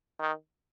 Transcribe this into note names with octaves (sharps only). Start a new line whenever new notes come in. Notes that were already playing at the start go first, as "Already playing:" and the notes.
D#3